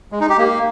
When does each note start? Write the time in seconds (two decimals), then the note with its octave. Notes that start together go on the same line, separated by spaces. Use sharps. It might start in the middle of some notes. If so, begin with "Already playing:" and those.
0.12 G#3
0.21 D#4
0.29 G4
0.38 A#3